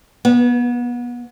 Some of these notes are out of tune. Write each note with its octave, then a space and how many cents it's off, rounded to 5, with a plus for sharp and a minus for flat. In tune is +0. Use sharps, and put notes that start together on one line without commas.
B3 -30